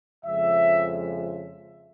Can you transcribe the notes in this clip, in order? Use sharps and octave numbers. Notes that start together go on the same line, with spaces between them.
F2 C#3 F3 G#3 E5